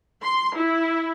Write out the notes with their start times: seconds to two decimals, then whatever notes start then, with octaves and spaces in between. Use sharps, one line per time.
0.22 C6
0.56 E4